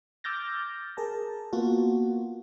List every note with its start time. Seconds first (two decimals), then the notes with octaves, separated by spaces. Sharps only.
0.24 D6 E6 F6 G6 A6 A#6
0.97 G#4 A#4 A5
1.53 A#3 B3 F4 F#4